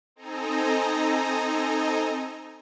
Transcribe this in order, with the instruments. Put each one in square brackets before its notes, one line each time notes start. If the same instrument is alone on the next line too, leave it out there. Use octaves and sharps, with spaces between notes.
[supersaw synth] C4 D#4 A4 D#5 G#5 A#5